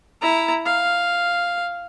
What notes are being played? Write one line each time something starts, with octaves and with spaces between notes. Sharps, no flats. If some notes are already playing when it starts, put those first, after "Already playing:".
E4 A#5
F5